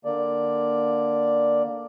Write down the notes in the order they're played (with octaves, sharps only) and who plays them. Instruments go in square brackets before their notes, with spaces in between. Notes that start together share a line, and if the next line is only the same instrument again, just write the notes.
[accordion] D3 A#3 D5